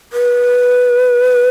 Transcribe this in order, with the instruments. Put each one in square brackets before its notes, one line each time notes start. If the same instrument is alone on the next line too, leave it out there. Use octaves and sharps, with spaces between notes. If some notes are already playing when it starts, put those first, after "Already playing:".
[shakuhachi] B4